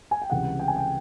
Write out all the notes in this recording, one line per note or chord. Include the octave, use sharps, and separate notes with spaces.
G#5
G5
C#2 C3 E3 G3 F#5
G5
G#5
G5